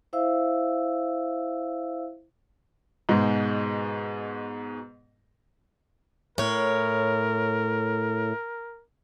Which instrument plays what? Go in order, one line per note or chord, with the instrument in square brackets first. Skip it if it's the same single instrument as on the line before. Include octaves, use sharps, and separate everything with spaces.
[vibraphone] E4 C5 E5 F5 E6
[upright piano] G#2 B2 G#3
[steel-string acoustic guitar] A2 C#5 [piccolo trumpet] A#4